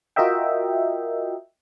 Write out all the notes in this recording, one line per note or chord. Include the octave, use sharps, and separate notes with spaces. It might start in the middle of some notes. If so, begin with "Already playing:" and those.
F4 F#4 A#4 D#5 E5 G5